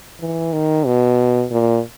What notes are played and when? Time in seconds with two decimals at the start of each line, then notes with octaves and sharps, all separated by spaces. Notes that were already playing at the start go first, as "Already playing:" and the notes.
0.21 E3
0.53 D#3
0.86 B2
1.51 A#2